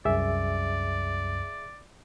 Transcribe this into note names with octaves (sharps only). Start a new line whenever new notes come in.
C2 F#2 G#4 D5 E5